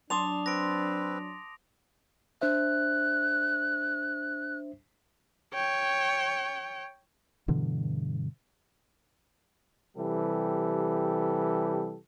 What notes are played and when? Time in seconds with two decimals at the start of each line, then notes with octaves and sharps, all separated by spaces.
0.10 F#3 D4 A5 C6 D6 D#6 F7
0.46 C4 B4 A#6 D7
2.42 D4 C5 E5 F#6
5.54 C#5 G5
7.48 G2 B2 D3 E3
9.96 C3 E3 G3 G4 A4